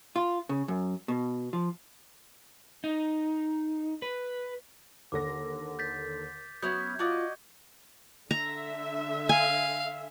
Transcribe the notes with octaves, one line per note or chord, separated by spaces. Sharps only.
F4
C#3
F#2
B2
F3
D#4
B4
D#2 D3 D6 A#6
G6 A6 B6
F#3 B3 C#4 E4 G6 G#6
F4 F#4 D5 D#5
D3 E5 A#5
F5 G#5